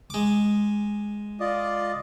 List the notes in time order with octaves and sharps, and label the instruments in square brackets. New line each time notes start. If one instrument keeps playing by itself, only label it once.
[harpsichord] G#3 D6
[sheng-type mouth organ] F4 D5 D#5